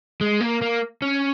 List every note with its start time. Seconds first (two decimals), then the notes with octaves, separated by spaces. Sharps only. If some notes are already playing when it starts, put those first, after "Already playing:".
0.21 G#3
0.40 A#3
0.62 A#3
1.02 C#4